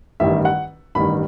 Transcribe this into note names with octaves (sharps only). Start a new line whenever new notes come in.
A1 G2 D#3 E5
F#5
A1 G2 D#3 B5